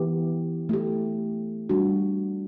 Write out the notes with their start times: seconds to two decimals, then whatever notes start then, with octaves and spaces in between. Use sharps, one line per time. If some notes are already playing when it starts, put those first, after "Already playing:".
Already playing: E3 B3 E4 G4
0.69 A3 E4 G4
1.69 G3 D4 F#4